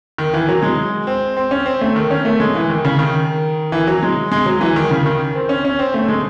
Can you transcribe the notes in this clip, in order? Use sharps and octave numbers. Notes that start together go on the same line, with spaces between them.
D#3
E3
F#3
G#3
C4
C4
C#4
C4
A3
D#3
C#4
A3
G#3
E3
D#3
C#3
D#3
E3
F#3
G#3
G#3
F#3
E3
D#3
C#3
D#3
C4
C#4
C#4
C4
A3
G#3